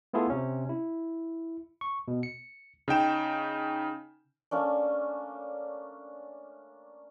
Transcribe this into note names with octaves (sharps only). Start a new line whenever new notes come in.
A3 B3 E4 F4 G#4 A4
C3 C#4
E4
C#6
B2
C#7
C#3 D#4 G5 E7
A3 A#3 C#4 D4